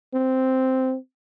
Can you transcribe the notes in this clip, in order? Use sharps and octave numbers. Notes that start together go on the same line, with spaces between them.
C4